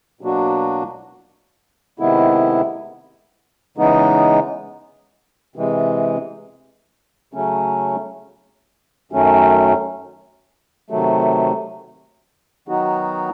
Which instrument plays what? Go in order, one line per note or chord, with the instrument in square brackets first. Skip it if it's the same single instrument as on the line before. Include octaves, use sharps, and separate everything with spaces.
[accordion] B2 F#3 A#3 D4 F#4
C3 D#3 G#3 B3 E4
C#3 E3 G#3 B3 D#4
C3 E3 G#3
C#3 F#3 A3 C#4
F#2 D#3 F#3 A3 C#4
C3 D#3 F#3 A3
D#3 F#3 B3 D#4 F#4